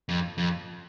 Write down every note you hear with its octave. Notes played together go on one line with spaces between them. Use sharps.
F2
F2